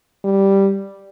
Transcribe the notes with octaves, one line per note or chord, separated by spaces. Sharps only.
G3